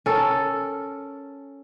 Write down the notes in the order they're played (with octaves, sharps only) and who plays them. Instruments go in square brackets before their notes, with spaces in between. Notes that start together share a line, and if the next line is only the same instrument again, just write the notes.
[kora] C#4 A4 A#4